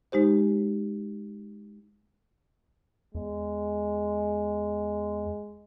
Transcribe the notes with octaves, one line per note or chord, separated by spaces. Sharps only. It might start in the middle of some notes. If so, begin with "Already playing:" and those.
G#3 D#4 G4 C5
E2 G#3